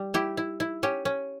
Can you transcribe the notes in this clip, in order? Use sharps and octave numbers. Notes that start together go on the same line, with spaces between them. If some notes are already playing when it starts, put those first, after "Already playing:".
Already playing: G3
E4 G4
E4
E4
C#4 G4
C#4